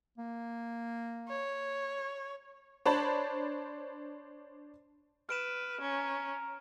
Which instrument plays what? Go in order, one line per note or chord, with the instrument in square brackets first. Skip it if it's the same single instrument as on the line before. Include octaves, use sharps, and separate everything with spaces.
[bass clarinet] A#3
[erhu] C#5
[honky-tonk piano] D4 C5 C#5 A5 B5
[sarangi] B4 [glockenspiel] F6 D7 E7
[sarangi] C#4 [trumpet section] A#5